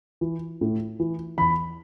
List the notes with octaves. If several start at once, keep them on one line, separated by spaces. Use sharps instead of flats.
E3
A2
E3
E2 B5